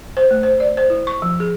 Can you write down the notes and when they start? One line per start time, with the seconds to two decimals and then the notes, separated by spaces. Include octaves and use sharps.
0.17 C5
0.31 A3
0.43 C5
0.60 D5
0.77 C5
0.90 E4
1.07 C#6
1.22 F3
1.40 G#4